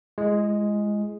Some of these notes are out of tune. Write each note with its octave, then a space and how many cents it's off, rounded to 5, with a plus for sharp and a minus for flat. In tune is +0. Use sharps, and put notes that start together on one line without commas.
G#3 +0 E4 +40